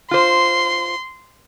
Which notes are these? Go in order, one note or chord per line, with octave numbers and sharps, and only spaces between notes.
F4 C5 C6